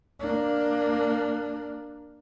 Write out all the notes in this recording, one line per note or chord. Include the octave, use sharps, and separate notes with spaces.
A#3 D4